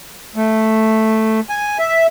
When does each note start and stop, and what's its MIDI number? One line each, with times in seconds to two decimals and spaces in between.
0.36 1.40 57
1.49 1.78 80
1.79 2.07 76